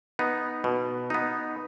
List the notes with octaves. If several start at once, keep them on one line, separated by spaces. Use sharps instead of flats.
B3 D#4
B2
B3 D#4